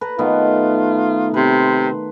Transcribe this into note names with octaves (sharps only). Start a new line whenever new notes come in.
B4 A5 A#5
D#3 A3 B3 F4
C3 B4 C6